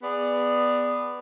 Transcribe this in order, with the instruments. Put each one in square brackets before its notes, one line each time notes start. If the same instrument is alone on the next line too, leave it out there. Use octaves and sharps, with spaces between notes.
[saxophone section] B3 G#4 D5